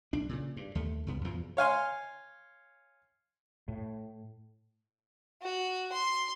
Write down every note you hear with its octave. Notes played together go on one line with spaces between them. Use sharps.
B1 D4
A#2 C#3
G2
D#2 A3
C#2 G2 B3
E2 B2 F3
C#5 F5 G#5 C6
A2
F#4
C6